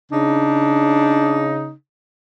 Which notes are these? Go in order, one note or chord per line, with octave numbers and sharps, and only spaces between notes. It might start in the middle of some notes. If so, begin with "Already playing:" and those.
C#3 D4 D#4